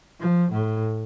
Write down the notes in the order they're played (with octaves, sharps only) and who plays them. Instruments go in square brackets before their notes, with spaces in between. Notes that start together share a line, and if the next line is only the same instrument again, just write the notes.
[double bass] F3
A2